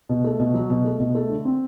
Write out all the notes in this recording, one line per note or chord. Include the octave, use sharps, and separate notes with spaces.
B2
A3
B2
F#3
B2
A3
B2
A3
D3
C4